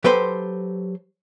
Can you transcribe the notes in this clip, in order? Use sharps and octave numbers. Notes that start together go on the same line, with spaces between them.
F#3 G4 A4 B4 C5 C6